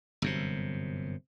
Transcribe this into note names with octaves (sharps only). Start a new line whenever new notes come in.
G1 F#2 C3